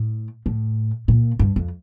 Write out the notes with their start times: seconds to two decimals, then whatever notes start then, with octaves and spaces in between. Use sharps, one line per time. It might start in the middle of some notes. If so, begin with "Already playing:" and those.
Already playing: A2
0.46 A2
1.08 A#2
1.39 G2
1.56 F2